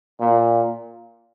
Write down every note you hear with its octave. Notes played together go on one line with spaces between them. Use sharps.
A#2